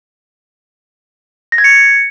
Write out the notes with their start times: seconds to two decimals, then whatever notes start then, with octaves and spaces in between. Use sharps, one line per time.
1.52 A#6
1.58 G#6
1.64 C#7